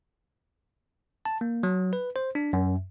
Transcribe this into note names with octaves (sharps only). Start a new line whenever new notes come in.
A5
A#3
F#3
B4
C5
D4
F#2